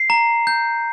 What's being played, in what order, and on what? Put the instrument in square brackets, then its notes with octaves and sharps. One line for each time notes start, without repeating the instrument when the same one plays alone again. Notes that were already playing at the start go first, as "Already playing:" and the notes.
Already playing: [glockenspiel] C7
A#5
G6